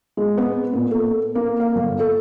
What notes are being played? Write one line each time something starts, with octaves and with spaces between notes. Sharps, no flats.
G#3
B3
A#2
A4
A#3
F5
G1
A4